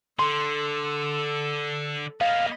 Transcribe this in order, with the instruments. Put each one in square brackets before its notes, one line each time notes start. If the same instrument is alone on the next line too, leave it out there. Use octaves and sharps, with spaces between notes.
[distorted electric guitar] D3 [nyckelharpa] A4 [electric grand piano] C6
[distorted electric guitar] A#3 B3 [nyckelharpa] D#5 [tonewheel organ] F5